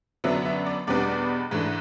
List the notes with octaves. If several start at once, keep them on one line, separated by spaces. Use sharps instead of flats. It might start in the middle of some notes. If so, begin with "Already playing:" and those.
F#2 D3 F#3 B3 D4 E5
E5
D5
E2 B2 G3 B3 D4 D5
G#2 E3 A3 D4